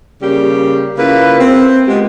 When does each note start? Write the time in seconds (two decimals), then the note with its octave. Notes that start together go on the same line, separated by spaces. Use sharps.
0.22 C#3 G3 A#3 G4
0.98 C#3 A#3 E4 F4 B4
1.40 C4
1.88 G#3 A#3 B3 F4 G4